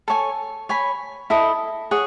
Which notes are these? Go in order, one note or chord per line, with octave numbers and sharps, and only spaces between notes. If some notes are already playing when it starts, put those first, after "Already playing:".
A4 C#5 G#5
C#5 G#5 B5
E4 A4 D#5
G#4 C#5 F#5